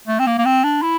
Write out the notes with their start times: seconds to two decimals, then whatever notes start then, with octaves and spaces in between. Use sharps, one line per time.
0.07 A3
0.19 C4
0.27 A#3
0.38 A#3
0.46 C4
0.64 D4
0.82 E4